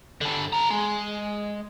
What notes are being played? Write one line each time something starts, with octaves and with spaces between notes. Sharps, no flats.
G2 D3
A4 A#5
G#3